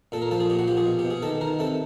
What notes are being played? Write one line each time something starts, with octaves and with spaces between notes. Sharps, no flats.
A#2 A4
A#4
F3 A4
G#4
A#2 G4
F#4
F3 G4
G#4
B2
G4
B2
G#4
D#3 A4
D#3 A#4
C3 A4